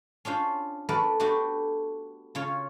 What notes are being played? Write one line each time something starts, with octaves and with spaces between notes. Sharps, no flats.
C#4 D4 F4 C5
A3 B3 A#4 B4 D5
A3 B3 D4 F#4 G4
C#3 F4 C#5